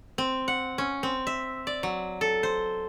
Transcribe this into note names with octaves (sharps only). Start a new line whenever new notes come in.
C4
F#5
C#4
C4
E5
D5
F#3
A4
C5